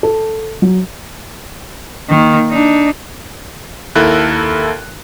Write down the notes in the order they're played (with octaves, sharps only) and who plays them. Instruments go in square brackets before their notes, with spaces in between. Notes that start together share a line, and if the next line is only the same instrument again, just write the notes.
[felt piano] A4
F#3
[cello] D#3 A#3
D4 D#4
[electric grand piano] D#2 E4 A4 A#4 F#6